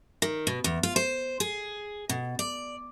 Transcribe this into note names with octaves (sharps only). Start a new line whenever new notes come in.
D#3
B2
E2
F4
C5
G#4
B2
D5